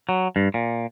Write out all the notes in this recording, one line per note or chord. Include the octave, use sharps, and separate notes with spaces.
F#3
G2
A#2